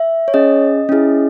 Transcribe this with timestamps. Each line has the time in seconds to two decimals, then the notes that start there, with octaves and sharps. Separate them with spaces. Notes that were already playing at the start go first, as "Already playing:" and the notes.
Already playing: E5
0.28 C#5
0.34 C#4 G#4 D#5
0.89 C#4 E4 G#4